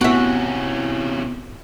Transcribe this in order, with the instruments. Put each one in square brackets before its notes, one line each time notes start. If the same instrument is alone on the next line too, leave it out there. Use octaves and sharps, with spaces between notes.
[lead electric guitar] C3 C#4 [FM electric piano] B3 E4 [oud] F#4 E5